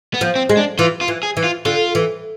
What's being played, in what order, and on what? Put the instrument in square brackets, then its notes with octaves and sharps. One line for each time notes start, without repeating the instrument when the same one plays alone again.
[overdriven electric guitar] B3
[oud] F3
[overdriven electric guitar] C4
[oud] G#3
[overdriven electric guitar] D4
[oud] E3 [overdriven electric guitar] F4
[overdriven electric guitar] F4
[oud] E3
[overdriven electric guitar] G#4
[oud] E3
[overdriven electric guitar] F4
[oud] D3 [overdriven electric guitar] F4
[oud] E3